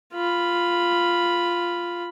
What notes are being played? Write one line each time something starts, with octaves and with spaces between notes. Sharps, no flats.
F4 B5